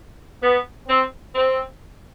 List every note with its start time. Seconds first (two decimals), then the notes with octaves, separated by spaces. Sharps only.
0.42 B3
0.88 C4
1.34 C4